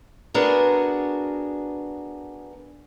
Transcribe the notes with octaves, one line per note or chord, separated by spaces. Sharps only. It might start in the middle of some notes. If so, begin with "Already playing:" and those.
B3 D4 F#4 G#4 A#4